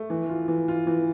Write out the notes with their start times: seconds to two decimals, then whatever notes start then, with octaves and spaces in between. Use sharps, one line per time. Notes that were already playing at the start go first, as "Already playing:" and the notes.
Already playing: A3
0.10 E3
0.29 F4
0.48 E3
0.68 F4
0.87 E3